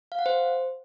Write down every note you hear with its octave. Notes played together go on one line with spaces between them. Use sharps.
F5
F#5
C5